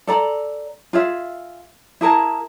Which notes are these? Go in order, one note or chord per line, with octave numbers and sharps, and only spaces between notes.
A4 D5 A#5
F4 G#4 E5
E4 G#4 A#4 A5